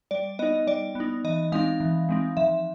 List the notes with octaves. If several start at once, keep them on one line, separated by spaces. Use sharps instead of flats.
G3 D5
B3 D#4 D#5
G3 D5
B3 D#4
E3 D#5
G#3 C4 D#4 F5
E3
G#3 C4 D#4
F3 E5